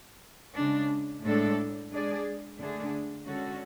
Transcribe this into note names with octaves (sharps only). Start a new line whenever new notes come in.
C#3 G#3 D4
A2 G#3 D4 A4
G#3 D4 G#4 D5
D3 A3 D4 G#4
D3 G#3 C#4 F#4 A4